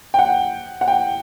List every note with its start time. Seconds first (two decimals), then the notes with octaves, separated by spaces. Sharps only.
0.14 G5
0.19 F#5
0.81 F#5
0.88 G5